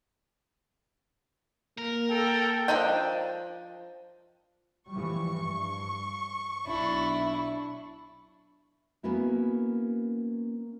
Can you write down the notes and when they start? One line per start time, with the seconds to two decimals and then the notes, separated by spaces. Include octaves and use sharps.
1.78 A#3 A#4
2.11 A4 G5
2.68 F3 D4 A#4 D#5 G5
4.89 E3 F3 G3 C#6
5.33 G2
6.66 B1 D4 E4
9.03 A#3 B3 C#4 E4 F#4